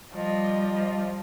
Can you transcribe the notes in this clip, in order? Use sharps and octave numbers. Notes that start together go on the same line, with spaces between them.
F3 G3 D#5